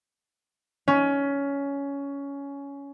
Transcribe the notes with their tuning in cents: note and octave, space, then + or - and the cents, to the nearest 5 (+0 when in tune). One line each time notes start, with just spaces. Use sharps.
C#4 +15